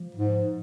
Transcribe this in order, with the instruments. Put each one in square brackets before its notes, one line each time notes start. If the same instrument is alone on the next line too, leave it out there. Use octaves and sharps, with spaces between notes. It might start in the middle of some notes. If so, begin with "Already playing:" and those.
Already playing: [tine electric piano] F3
[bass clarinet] G#2